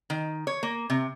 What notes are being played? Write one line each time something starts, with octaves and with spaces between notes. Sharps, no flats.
D#3
C#5
A#3
C3